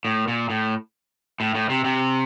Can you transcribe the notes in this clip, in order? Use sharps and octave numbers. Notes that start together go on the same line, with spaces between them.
A2
A#2
A2
A2
A2
C3
C3